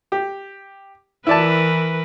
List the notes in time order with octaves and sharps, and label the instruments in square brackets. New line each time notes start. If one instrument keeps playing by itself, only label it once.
[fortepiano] G4
[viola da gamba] E3 A#4 B4 [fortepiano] E4 D5 A5